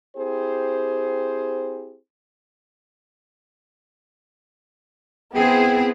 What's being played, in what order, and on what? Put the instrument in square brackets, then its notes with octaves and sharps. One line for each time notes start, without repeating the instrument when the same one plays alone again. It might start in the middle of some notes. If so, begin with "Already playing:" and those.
[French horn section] C4 E4 G4 G#4 C5
[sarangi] B3 [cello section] C4 E4 G#4 [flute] G5